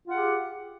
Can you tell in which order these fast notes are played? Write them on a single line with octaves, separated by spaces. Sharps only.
F4 F#5 G#4 G4